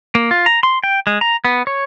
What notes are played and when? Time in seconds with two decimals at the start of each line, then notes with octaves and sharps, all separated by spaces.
0.15 A#3
0.31 F4
0.46 A#5
0.63 C6
0.84 G5
1.07 G#3
1.21 A#5
1.45 B3
1.67 C#5